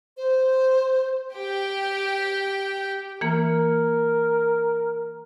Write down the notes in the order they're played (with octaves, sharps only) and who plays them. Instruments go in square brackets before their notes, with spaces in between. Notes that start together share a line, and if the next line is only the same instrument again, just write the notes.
[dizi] C5
[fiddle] G4 G5
[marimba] E3 A#3 [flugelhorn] A#4